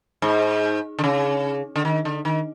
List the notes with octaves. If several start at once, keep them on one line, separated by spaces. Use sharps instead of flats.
G#2
D3
C#3
D3
D#3
D3
D#3